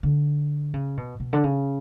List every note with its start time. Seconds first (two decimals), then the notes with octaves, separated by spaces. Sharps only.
0.03 D3
0.74 C#3
0.97 B2
1.20 B2
1.33 D3
1.44 C#3